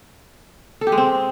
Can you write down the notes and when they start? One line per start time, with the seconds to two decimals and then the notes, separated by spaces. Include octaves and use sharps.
0.81 A4
0.87 G4
0.92 G#3
0.98 C4